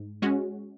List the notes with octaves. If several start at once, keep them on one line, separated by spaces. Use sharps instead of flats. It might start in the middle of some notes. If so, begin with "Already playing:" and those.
Already playing: G#2
G#3 C#4 F#4